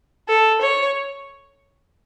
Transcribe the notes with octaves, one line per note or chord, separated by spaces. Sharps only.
A4
C#5